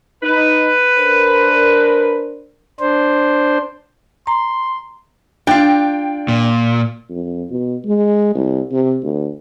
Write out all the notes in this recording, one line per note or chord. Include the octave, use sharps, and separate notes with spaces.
D#4 B4
D4 A#4 C5
D4 C5
A#5 C6
D4 F4 G5
A#2
F2
B2
G#3
C2
C3
D2